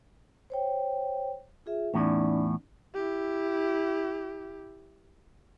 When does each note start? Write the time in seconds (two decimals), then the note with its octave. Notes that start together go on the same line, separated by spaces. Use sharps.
0.50 C5 C#5 G5
1.66 F4 G#4 E5
1.94 E2 A2 C#4 D#4 D5
2.95 E4 G4